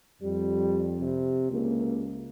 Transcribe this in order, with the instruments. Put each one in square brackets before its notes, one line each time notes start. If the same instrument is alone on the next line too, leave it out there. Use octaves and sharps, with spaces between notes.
[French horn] F2 [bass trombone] G3
[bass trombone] C3
[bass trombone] C#2 [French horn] A#3